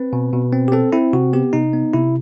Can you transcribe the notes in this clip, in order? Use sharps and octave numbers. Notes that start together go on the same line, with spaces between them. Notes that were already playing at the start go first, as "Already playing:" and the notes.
Already playing: C4 B4
B2
B2
C4
G4
C4 A4
C4 E4
C3 F#4
B3 G4
C3 D#4
B3
C3 E4